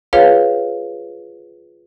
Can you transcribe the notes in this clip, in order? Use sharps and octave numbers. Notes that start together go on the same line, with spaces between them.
F4 G#4 B4 C#5 F5